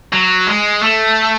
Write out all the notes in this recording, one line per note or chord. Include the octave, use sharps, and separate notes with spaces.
F#3
G#3
A3